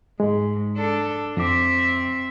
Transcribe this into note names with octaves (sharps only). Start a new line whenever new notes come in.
G#2 G#3
D4 A4
F2 C4 E5 D6